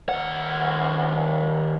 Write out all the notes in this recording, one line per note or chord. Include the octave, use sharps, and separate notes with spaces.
D#2 F#5